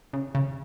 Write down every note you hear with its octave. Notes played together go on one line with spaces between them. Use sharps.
C#3
C#3